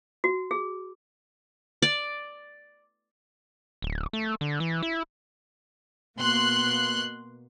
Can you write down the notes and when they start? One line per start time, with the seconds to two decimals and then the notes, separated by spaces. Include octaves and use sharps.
0.24 F#4
0.51 G#4
1.82 D5
3.82 D1
4.13 A3
4.41 D3
4.60 E3
4.82 E4
6.18 B2 A#3 C6 F#6